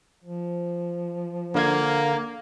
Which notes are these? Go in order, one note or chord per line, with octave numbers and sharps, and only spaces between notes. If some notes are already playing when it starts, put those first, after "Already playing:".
F3
D3 A#3 F5 G#6